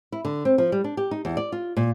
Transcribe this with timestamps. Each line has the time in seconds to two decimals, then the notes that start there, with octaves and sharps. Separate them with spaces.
0.12 E4
0.25 D3
0.45 C4
0.58 F3
0.72 G3
0.84 D4
0.97 G4
1.11 D#4
1.25 E2
1.37 D5
1.52 F4
1.77 A#2